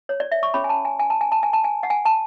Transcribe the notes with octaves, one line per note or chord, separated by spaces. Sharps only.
C#5
D5
E5
C#6
C#4 G#4 C#5 B5
G#5
A5
G#5
G#5
A5
G#5
A5
G#5
A5
G#5
F#5
G#5
A5